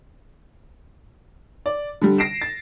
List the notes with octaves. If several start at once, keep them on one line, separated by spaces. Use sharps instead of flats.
D5
D3 G3
A#6 C7 D7 E7
A6